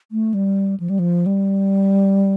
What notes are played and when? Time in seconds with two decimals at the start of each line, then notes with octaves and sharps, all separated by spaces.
0.12 A3
0.34 G3
0.80 F3
0.90 G3
0.99 F3
1.26 G3